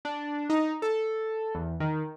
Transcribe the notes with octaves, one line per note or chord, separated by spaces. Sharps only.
D4
D#4
A4
E2
D#3